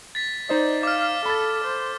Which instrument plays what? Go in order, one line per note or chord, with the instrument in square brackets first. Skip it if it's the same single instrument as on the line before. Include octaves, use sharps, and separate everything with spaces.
[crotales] A6 B6
[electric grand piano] D#4 C5 D#5 [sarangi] D5
[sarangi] F5 [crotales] D6 F6
[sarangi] A4 [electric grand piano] B5 A6
[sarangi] C5